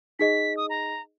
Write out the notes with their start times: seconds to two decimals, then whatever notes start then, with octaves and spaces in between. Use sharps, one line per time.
0.19 D#4 G#4 D#5 B6
0.57 D#6
0.70 A#5